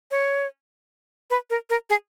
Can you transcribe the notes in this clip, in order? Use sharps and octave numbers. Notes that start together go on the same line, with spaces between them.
C#5
B4
A#4
A#4
G#4